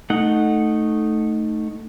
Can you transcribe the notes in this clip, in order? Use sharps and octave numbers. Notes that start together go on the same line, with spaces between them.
A3 D#4 F#5